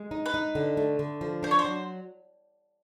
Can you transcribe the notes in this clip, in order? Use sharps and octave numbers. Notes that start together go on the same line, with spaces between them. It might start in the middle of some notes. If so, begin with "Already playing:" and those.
Already playing: G#3
D#4
B4
D#4
D3
A3
D3
F3
D4 C5
C#5
C5
F#3